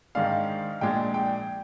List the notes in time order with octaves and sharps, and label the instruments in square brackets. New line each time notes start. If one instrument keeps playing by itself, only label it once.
[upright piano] G#2 D#3 G#3 D4 F5
A#1 A#2 G#3 D4 G5
G5